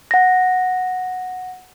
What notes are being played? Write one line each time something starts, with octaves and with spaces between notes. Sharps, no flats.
F#5 A#6